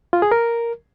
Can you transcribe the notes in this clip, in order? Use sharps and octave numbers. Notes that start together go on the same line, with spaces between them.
F4
G#4
A#4